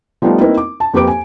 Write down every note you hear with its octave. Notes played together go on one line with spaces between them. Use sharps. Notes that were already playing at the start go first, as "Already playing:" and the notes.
F3 G3 A3 B3 D#4 F4
A#3 C4 D#4 E4 A#4 B4
D6
A5
F2 A#3 G4 B4 D6 D7
G#5